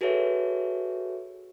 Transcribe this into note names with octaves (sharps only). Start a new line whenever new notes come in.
F#4 G#4 A4 B4 C#5 E5